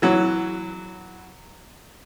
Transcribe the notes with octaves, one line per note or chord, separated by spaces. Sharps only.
E3 F#3